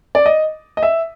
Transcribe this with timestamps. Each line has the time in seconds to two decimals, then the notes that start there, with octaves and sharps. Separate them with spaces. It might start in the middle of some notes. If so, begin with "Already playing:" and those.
0.15 D5
0.26 D#5
0.77 D#5
0.83 E5